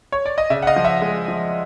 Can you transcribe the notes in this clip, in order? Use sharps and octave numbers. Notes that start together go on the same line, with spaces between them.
C#5
D5
D#5
C#3 D5 E5
F#5
D#5 F5
F3
E5 F#5
G#3
F3